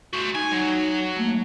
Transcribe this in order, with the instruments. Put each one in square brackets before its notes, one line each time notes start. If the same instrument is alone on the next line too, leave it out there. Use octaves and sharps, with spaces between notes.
[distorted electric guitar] F#4 C5
[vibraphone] D#4 [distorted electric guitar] G#5
[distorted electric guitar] F#3
[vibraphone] A3 A#3